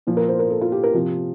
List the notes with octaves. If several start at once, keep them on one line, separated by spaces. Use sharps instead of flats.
A#2 F3
A#4
C5
A#4
A4
F4
G4
A#4
C3 F3